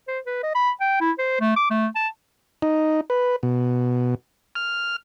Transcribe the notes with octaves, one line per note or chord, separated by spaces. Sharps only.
C5
B4
D#5
B5
G5
E4
C5
A3
D6
A3
A5
D#4
B4
B2
F6